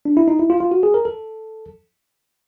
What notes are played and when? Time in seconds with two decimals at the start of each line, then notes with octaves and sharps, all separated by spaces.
0.05 D4
0.17 E4
0.28 D#4
0.39 E4
0.50 F4
0.61 F4
0.71 F#4
0.83 G#4
0.94 A#4
1.05 A4